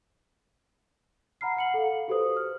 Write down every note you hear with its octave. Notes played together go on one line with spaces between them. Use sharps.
F#5 A#5 B5 F6 C7
F#5 C#7 F#7
A4 F5
F#4 G4 A4 B4 C5 D#6
F6